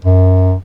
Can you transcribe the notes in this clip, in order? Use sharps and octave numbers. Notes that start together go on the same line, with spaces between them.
F#2